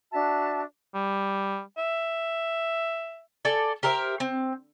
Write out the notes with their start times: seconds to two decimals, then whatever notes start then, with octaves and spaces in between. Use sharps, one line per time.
0.13 D4 F#4 E5 A5
0.94 G3
1.78 E5
3.45 A4 D5 G#5
3.83 G4 A#4 C5 E5
4.20 C4